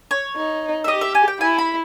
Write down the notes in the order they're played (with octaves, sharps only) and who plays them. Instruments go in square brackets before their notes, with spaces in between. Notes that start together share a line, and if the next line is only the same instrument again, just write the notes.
[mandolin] C#5
[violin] D#4
[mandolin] E5
[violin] G4 [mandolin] D#5
[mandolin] E5
G#5
G5
[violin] E4 [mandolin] G#5
[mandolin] B5